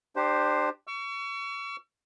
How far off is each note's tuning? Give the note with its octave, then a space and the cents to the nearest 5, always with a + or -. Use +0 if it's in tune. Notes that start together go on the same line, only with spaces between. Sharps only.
D4 +30 G4 +0 C5 +0
C#6 +30 E6 +40